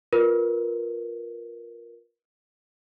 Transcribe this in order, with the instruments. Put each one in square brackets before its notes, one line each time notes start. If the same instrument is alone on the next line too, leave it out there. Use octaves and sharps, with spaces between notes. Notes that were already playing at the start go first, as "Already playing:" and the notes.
[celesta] F4 A#4 B4